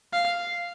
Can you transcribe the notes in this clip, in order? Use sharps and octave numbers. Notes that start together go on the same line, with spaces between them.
F5